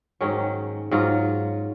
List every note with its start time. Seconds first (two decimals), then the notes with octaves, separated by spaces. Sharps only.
0.21 G#2 D#3 F#3 C#4
0.91 G#2 F#3 F4